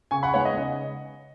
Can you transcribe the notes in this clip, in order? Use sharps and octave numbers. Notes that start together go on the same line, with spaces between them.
C#3 G#5 C#6
F#5 B5
G#3 B3 D#4 C#5 F#5
D#5
C#3 D#5